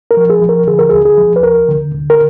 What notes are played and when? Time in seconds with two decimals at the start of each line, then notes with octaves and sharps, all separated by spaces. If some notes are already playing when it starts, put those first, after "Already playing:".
0.11 A#4
0.17 F3
0.30 G#4
0.42 F3
0.49 A#4
0.67 D3 G#4
0.79 A#4
0.90 D2 G#4
1.05 G#4
1.18 F3
1.36 B4
1.43 D2 A#4
1.68 D3
1.94 D3
2.10 A#4